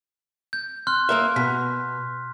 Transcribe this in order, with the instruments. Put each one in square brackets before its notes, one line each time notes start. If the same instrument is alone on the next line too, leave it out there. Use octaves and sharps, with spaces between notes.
[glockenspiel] G6
C6 F6 F#6
[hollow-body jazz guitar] A#3 A#4 E5
[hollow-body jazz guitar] B2 [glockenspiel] B6